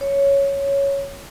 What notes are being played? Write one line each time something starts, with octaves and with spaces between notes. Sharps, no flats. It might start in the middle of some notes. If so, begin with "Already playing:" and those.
C#5